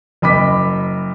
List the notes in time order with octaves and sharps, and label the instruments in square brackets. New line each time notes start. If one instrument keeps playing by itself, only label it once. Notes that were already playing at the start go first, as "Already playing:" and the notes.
[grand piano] F#1 D#5 B5 D6 B6